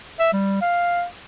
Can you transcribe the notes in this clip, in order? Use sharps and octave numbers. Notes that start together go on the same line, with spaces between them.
E5
G3
F5